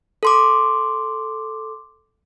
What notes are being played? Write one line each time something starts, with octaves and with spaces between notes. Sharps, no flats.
A4 C6 D6